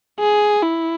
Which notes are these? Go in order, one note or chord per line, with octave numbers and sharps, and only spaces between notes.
G#4
E4